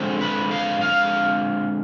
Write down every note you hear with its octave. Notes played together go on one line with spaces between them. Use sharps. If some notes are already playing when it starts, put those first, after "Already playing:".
Already playing: D3 G#3 C4
B4
F5
F5